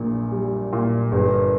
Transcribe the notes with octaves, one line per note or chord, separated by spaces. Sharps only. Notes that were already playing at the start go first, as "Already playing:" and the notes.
Already playing: A#1 A#2
G3
A#2
G1